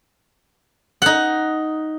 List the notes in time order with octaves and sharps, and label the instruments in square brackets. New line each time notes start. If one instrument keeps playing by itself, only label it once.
[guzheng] D#4 F#5